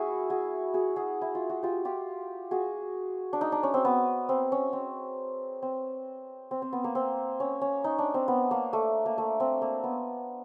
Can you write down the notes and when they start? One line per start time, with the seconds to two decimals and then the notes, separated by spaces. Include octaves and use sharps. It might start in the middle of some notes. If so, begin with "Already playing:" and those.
Already playing: E4 F#4 G#4
0.30 F#4 G#4
0.74 F#4 G#4
0.96 F#4 G#4
1.21 E4
1.35 F4
1.49 F#4
1.63 F4 G4
1.85 F4 G4
2.51 F#4 G#4
3.33 D4
3.41 D#4
3.52 D4
3.63 C#4
3.74 C4
3.85 B3
4.29 C4
4.52 C#4
4.73 C4
5.62 C4
6.51 C4
6.62 C4
6.73 B3
6.84 A#3
6.95 C4
7.40 C#4
7.61 C#4
7.84 D#4
7.98 D4
8.14 C4
8.28 B3
8.51 A#3
8.73 A3
9.06 A#3
9.18 A3
9.40 C4
9.62 A#3
9.84 B3